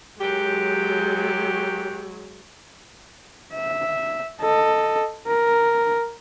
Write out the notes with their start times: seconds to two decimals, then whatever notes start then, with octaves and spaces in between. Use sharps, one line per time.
0.20 F#2 F#3 G#3 G4
3.54 E5
4.41 A4 D#5
5.27 A#4